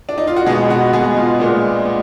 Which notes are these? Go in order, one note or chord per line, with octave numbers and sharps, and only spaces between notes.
D4
D#4
F4
F#4
B2 G#3 B3 G#4
F#4
B2 G#3 B3 G#4
F4
A#2 G#3 B3 D4
B3